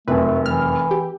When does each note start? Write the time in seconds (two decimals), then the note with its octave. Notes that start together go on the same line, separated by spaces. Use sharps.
0.08 F1 F#2 A3 B4
0.46 E3 F6
0.91 G4